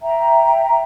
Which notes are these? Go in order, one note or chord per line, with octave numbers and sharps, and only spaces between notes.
E5 G5 A#5